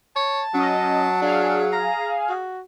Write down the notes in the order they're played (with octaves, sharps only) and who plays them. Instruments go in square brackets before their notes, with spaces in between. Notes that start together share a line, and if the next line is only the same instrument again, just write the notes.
[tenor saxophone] C#5 [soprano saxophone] A5
[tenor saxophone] F#3 [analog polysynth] C#4 D#5
[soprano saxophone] D4 [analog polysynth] G#4 F5
[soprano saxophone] A#5
F#4